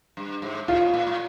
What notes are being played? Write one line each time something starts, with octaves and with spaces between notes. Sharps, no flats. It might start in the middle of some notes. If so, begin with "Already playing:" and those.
G2
G#2
A2 F4
B2
A#2
A2